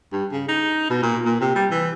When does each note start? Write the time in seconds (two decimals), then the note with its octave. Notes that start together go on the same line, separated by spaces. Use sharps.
0.12 G2
0.32 C#3
0.48 D#4
0.90 B2
1.03 A#2
1.25 A#2
1.41 C3
1.55 G3
1.71 E3